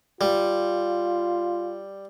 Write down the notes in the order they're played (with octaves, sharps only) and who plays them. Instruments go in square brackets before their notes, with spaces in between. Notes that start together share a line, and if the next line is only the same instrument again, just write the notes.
[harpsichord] G3 [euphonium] F4